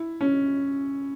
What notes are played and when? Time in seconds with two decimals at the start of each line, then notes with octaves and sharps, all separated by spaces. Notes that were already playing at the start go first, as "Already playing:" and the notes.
Already playing: E4
0.21 C#4